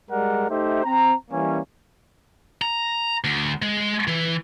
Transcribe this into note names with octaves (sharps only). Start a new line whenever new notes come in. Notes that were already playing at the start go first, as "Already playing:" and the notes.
G3 G#3 A#4 D5 F#5
A3 D#4 G4 C5 E5
C4 A#5
E3 G3 A#3 C#4
A#5
D2
G#3
E3